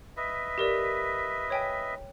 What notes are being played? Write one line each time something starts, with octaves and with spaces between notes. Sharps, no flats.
B4 D#5 E5
G4 A#4 D5
C#5 G5 G#5